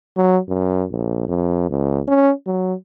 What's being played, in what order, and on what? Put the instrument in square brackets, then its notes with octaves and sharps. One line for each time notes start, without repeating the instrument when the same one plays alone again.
[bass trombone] F#3
F#2
A#1
F2
C#2
C#4
F#3